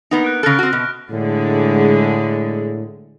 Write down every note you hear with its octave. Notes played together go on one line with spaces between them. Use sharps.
A#3 B3 D#4
F#6 D7
C#3 A4 F6 F#6 A#6
C4 F#4
B2
A2 D3 G#3